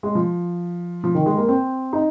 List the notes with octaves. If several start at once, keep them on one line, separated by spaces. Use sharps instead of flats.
G#3
F3
F3
D#3
G#3
A#3
C4
D#4